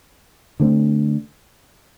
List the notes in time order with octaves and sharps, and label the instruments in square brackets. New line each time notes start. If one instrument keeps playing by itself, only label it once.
[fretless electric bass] D3 A3 C4